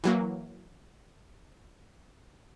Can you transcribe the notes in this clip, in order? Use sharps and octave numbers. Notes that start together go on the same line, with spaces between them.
E3 F#3 A#3